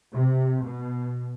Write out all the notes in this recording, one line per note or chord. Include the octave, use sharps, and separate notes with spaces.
C3
B2